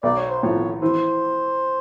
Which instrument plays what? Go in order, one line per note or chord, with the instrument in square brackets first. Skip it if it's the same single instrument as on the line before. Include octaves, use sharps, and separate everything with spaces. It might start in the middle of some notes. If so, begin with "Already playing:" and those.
[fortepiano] B1 [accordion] D5
[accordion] C#5
C5
[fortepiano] A2 F3 [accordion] C#5
[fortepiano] E3 [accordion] C5